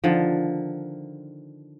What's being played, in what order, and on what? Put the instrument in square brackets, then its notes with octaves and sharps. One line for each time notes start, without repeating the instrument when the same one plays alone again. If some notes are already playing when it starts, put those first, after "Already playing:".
[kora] D3 D#3 F3